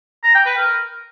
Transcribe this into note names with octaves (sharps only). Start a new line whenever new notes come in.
A#5
G5
B4
A#4